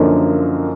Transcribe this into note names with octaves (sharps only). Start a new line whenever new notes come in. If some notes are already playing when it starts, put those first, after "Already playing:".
Already playing: F#2 D3 F3 A#3 D#4